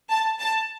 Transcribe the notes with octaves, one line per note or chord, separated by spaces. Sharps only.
A5
A5